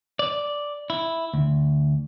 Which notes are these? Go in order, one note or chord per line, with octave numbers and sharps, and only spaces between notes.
D5
E4
D2